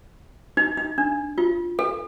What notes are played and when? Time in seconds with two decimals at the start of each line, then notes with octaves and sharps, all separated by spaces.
0.57 D#4
0.77 D#4
0.98 D4
1.38 F4
1.79 A4